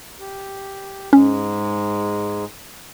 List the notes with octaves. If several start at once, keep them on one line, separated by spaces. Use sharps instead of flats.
G4
G#2 G#3 C#4